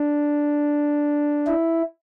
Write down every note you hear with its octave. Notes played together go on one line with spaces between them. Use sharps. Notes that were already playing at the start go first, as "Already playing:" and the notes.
Already playing: D4
E4